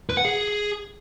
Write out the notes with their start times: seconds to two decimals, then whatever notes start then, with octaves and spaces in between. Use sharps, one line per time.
0.10 B4
0.17 F#5
0.25 G#4